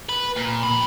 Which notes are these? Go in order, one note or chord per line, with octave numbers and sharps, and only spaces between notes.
B4
A#2
F2 B5